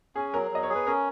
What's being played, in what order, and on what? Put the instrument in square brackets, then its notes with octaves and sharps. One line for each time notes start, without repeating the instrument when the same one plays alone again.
[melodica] C#4 [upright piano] G#4
[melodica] F#3 [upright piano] A#4
[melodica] F#3 [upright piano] D#5
[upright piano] C#5
[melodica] G#4
[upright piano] B4
[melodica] C#4 [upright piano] A#4